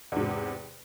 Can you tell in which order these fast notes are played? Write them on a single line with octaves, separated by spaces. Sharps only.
E2 G#2 C3